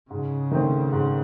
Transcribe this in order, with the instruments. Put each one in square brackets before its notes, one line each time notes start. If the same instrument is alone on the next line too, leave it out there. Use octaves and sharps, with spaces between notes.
[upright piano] G#2 [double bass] C#3
[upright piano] D#3 A3 C4
G#2